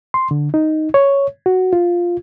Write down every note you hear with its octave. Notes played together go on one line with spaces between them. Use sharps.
C6
D3
D#4
C#5
F#4
F4